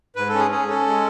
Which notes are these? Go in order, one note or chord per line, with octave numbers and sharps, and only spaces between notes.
G#2 B4
A4
C#4
G#4
C#4 G#4
C#4 A4
G#3